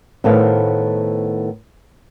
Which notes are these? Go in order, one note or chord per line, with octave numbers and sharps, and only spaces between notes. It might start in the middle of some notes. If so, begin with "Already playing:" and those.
A2 D#3 B3 A4 C5 F5